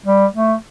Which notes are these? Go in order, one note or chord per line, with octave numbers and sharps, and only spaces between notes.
G3
A3